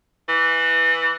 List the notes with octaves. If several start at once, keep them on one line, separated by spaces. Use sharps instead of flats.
E3